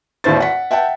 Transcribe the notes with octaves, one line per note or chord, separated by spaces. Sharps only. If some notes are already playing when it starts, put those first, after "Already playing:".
G#1 D#2 A2 C5 A6
F#5 B6
E5 F#5 G5 A5